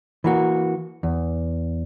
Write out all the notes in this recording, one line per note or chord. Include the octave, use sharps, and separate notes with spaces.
E3 A#3 F#4
E2